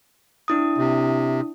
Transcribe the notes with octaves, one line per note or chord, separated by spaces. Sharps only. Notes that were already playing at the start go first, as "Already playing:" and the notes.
D4 E4 D#6
C3